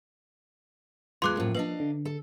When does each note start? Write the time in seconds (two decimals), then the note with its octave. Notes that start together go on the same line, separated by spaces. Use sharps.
1.22 E2 G#3 F4 C6 D6 F#6
1.37 F#2 A2 F3 A#3
1.55 D4 B4 D#5 F5
1.80 D3
2.05 A4